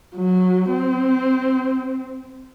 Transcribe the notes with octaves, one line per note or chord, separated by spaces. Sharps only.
F#3
C4